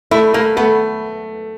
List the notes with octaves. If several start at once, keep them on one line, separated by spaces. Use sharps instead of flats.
A3 E4
A3 A#3
A3 B3